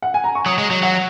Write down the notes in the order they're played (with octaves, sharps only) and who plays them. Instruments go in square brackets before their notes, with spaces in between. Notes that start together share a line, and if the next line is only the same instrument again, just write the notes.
[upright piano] F#5
G#5
A#5
C#6
[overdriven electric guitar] F#3 [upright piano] D#6
[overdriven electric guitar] G#3
F#3
[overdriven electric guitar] F#3 [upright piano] F#5